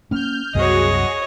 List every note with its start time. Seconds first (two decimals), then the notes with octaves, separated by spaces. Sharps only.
0.11 A#3 C#4 F6 G6
0.55 C2 F#2 B3 F#4 G#4 C#5 D#5